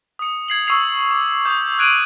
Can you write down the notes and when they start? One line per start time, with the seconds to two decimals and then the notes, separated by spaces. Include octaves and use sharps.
0.19 D#6 C#7
0.48 G#6 C7 F#7
0.67 C#6 E6 G#6 C7 F7
1.11 D6
1.45 D6 D#6 G6
1.79 F#6 G#6 D7 D#7 F7 F#7